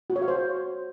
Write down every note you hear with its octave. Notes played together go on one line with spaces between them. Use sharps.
F#4
C#5
F5
C5